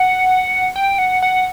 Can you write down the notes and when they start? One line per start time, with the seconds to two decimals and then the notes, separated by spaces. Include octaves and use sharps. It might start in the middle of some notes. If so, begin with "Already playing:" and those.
Already playing: F#5
0.76 G5
0.99 F#5
1.22 F#5